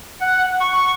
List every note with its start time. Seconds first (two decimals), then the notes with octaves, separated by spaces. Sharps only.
0.21 F#5
0.60 C#6